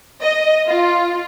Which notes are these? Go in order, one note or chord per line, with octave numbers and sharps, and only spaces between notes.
D#5
F4